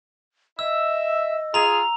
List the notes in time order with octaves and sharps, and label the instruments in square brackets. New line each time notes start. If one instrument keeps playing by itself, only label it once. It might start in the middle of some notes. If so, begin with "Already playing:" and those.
[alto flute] D#5 [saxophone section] E5 [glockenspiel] E6
[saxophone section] F4 G#4 [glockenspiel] A#5 F7